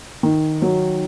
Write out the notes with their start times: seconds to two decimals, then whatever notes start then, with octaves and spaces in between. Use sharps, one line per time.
0.23 D#3
0.62 F#3